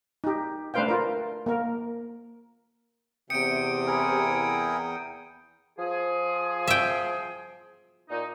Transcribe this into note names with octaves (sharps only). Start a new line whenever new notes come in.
D#4 G4
A3 D4 B4 C5 F5 G5
F4 A#4
A#3 A#4
E2 C3 G5 D#6 C#7 D7
E4 G#4 A#4
F3 G#4
E5 G5
A#2 D#4